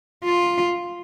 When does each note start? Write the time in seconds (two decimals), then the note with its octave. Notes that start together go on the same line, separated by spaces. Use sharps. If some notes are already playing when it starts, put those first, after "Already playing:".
0.25 F4